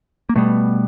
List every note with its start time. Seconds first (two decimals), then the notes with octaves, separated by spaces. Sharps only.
0.29 A#3
0.36 B2 G3 A3 B3